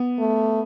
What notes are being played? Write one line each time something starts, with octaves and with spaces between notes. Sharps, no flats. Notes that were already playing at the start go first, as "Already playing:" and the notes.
Already playing: B3
A3